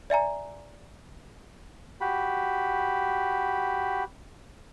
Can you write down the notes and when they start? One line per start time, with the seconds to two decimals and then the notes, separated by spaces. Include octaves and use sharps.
0.10 D5 E5 G#5 A#5
2.01 F#4 G4 B5